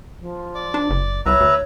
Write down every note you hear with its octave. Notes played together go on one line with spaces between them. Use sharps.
F3
D5
D4
F#1
C2 B4 C#5 E5 A#5
D2